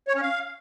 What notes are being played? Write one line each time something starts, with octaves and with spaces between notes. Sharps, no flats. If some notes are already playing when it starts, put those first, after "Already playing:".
C#5
C#4
F5